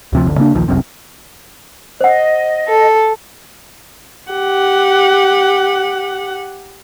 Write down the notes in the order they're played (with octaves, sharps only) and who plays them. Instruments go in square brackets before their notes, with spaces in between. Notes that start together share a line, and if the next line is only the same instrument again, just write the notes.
[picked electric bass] D2 C3 F3
G1 D2
C#3 A#3 D4
A#1 D#2 D#3 F3
F1 C2 F#2 C3
[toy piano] C5 F#5 [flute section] D#5
[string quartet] A4
[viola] G4 F#5